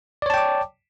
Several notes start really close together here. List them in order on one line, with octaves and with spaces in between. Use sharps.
D5 C#5 A5 G5 D6